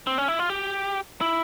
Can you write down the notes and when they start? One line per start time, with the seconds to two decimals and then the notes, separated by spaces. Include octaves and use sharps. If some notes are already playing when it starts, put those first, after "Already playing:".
0.07 C4
0.18 C#4
0.28 E4
0.39 F4
0.49 G4
1.21 E4